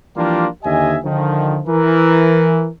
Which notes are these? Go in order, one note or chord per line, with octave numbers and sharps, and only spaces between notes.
E3 F3 G3 A#3 D4 F4
D#2 D3 G4 D#5 E5 G#5
D3 D#3 F3
E3 A#4